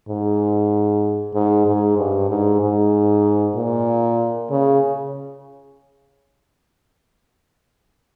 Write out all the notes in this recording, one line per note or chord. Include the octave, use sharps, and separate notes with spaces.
G#2
G#2
G#2
G2
G#2
G#2
A#2
C#3